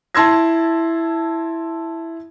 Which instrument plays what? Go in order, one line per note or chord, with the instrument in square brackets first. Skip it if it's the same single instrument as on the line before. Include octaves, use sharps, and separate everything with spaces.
[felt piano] E4 A5 C6 E6 G#6 A#6